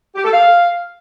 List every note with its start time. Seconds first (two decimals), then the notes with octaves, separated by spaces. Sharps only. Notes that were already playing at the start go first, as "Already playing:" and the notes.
0.15 G4
0.24 A4
0.33 F5